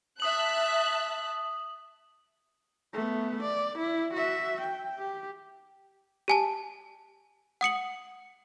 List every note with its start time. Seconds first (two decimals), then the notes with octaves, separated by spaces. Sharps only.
0.20 E5 A5 D#6 F#6 F#7
2.93 A3 B3
3.43 D5
3.78 E4
4.13 F#4 E5
4.61 G5
4.99 G4
6.28 G4 G#5 A5
7.61 F#5 D#6 C#7 F#7